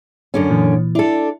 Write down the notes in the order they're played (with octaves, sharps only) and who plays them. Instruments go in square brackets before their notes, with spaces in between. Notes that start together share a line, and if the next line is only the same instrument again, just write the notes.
[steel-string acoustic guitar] F#2 D3 C#4
[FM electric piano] A#2 E3
[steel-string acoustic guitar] D4 A4 [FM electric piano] E4